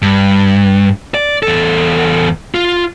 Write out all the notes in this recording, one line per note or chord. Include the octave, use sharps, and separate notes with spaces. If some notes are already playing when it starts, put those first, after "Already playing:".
G2
D5
E2 A4
F4